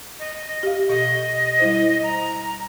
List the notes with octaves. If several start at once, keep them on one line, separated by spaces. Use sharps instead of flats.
D#5
G4 F5
B2 D#5
G3 E4 C5
A#5